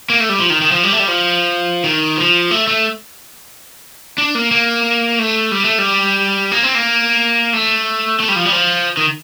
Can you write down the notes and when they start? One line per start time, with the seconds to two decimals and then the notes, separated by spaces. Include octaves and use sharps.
0.10 A#3
0.20 A3
0.29 G3
0.40 F3
0.50 D#3
0.62 D#3
0.72 F3
0.84 G3
0.92 A3
1.00 G3
1.08 F3
1.84 D#3
2.17 F3
2.51 A3
2.67 A3
4.18 D4
4.35 A#3
4.51 A#3
5.19 A3
5.51 G3
5.65 A3
5.78 G3
6.52 A#3
6.63 C4
6.75 A#3
7.53 A3
8.20 A3
8.28 G3
8.36 F3
8.45 G3
8.52 F3
8.97 D#3